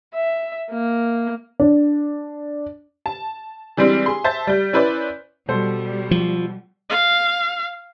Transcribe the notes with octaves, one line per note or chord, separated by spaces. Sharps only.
E5
A#3
D4
A5
E3 G3 G#3 C4 D4
G#4 C6
C5 E5 A5 A6
G3 G6
C#4 E4 B4 C5 D5
B2 G3 A4 C5
F3
F5